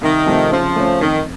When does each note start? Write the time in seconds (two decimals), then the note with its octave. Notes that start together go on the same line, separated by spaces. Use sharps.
0.01 C2 D#3
0.26 C3 F3 A3 D#4
0.52 C#3 F3
0.76 A3 C#4
1.01 F2 D#3